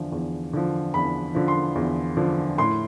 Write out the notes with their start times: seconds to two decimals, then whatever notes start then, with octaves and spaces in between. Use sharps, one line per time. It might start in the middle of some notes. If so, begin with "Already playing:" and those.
Already playing: E2 D3 F3
0.12 E2
0.53 D3 F3
0.94 E2 B5
1.35 D3 F3
1.48 C6
1.75 E2
2.17 D3 F3
2.58 A2 C6